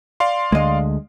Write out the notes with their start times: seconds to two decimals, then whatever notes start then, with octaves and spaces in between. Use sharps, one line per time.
0.20 D5 F5 C6
0.52 D2 D3 G#3 D#5